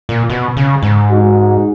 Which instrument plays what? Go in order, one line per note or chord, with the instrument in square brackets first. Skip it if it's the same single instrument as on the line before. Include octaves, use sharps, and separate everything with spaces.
[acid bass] A#2
B2
C#3
G#2
[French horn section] G#3 D#4 F#4